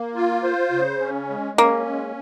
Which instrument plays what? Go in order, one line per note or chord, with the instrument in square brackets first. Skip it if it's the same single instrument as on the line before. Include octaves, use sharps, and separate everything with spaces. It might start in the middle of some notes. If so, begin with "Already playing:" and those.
Already playing: [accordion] A#3
F4
C5
C#3
C#4
G#3
[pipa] A#3 [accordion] C#4
[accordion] G#3